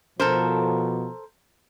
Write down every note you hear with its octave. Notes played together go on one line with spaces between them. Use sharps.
B2 F3 A4 A#4 C5